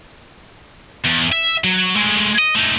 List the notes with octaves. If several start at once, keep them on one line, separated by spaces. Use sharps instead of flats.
E2
E5
F#3
G#3 A3
D#5
A3 D#4